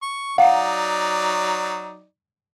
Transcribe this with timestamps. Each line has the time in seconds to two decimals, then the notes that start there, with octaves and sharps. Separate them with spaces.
0.02 C#6
0.38 F#3 D#4 D5 F5 F#5